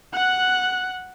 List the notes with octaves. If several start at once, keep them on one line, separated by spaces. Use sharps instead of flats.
F#5 F#6